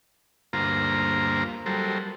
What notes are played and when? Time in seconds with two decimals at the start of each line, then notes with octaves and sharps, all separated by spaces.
0.53 D2 G2 A#3 F4 C5 A#5
1.66 F#3 G3 A4 A#4 C5